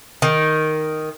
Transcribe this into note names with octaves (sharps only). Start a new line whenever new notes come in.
D#3